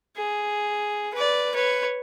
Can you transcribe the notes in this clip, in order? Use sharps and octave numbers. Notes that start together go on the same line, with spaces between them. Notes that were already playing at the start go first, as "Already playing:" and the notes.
G#4
B4 D5
B4 C#5